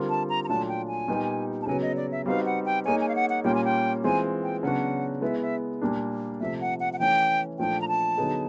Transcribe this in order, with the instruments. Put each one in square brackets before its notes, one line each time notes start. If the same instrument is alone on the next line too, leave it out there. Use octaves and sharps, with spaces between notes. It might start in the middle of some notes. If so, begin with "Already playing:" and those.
Already playing: [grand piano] D3 G3 C4 F4 A#4
[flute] A5
A#5
A#5
[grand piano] A#2 F#3 A3 D4 F4 [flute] A5
[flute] G5
G#5
[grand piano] A#2 G3 B3 D#4 G4
[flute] A5
[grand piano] C#3 F#3 B3 [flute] G#5
[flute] D#5
D5
E5
[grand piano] G3 C4 D#4 F#4 B4 [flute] F5
[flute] F#5
G5
[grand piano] A#3 D#4 G#4 C#5 [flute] G#5
[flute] G#5
F5
F#5
F#5
[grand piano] A#2 G3 A#3 C#4 F4 [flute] G5
[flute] G#5
G5
[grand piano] E3 G#3 C4 F4 [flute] G#5
[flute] G5
[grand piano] C#3 F#3 B3 D4 F#4 [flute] F#5
[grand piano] G#3 B3 E4 [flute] E5
[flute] E5
[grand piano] A#2 G3 A#3 D4
[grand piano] C3 F3 A3 [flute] E5
[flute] F#5
F#5
F#5
[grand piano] E3 A3 C#4 [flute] G5
[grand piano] A#2 F3 A3 D4 [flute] G5
[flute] A#5
A5
[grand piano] D3 F#3 B3 D#4 G#4